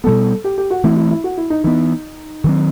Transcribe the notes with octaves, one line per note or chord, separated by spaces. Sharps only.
B2 G3 B3 A4
G4
G4
F#4
E3 A3 C4 E4
E4
E4
F#4
E4
D#4
E3 B3 D#4
D#3 F#3 C4